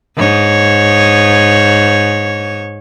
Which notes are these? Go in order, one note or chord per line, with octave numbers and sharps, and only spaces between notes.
G#2 C#5